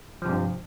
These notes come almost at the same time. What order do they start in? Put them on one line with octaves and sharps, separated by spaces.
F3 C3 G2